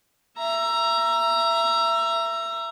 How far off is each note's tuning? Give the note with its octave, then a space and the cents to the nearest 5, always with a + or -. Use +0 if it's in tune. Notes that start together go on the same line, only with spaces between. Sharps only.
E5 +25 A#5 +5